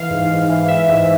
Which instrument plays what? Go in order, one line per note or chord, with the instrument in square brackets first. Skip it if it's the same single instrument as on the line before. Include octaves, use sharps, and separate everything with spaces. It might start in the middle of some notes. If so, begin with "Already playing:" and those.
Already playing: [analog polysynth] E3 F5
G#2
G#2
E3
E3 E5
G#2